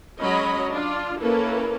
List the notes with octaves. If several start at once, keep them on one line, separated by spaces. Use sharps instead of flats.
F#3 G#3 C#4 C#5 D#5 B5
D4 F4
A#3 C#4 E4 A4 B4